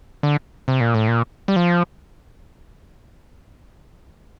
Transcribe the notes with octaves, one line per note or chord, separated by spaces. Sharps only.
D3
C3
A#2
A2
A#2
G3
F3